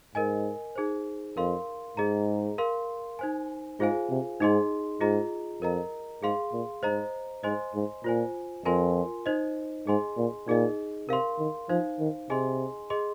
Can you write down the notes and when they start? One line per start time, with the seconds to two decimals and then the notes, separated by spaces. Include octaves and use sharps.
0.15 G#2 A#4 D#5 G#5
0.76 D#4 G#4 C5
1.37 F2 A#4 F5 C6
1.97 G#2 G#4 D#5 A#5
2.58 A#4 F5 C6
3.19 D#4 C5 G#5
3.80 G#2 F4 G#4 C5 F5 G#5
4.10 C3
4.40 G#2 D#4 G#4 D#5 C6
5.01 G#2 F4 G#4 D#5 A#5
5.62 F2 A#4 D#5 A#5
6.22 G#2 G#4 F5 C6
6.53 A#2
6.83 G#2 C5 D#5 A#5
7.43 G#2 C5 D#5 G#5 C6
7.74 G#2
8.04 A#2 F4 C5 G#5
8.65 F2 F4 A#4 G#5 C6
9.26 D#4 C5 D#5
9.87 G#2 G#4 D#5 G#5 C6
10.17 A#2
10.47 A#2 D#4 G#4 D#5
11.08 C3 A#4 F5 C6
11.39 D#3
11.69 F3 D#4 C5 F5
12.00 D#3
12.30 C3 G#4 D#5 G#5 C6
12.90 G#4 D#5 C6